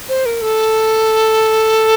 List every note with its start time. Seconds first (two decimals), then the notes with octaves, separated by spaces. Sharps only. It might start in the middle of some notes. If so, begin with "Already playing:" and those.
0.09 C5
0.26 A#4
0.42 A4